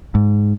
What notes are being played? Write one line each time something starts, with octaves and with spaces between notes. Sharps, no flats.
G#2